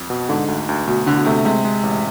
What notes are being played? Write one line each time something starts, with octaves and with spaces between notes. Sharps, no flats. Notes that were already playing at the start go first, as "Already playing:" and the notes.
Already playing: F2
B2
G#2 D3
D2
D2
D2 B2
D2 D3
B2
C3 A3
C3 G#3
G#3
A1